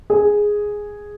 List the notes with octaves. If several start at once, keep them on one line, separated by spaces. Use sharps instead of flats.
G#4